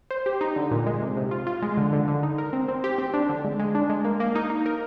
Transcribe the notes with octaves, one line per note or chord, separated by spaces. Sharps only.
C5
G4
D#4
D3
A#2
G#3
C3
C3
F4
F4
G#3
D3
D3
D3
D#4
A#4
C4
C4
G4
C4
D4
D3
G#3
G#3
D4
G#3
A#3
A#3
D#4
D#4
A#4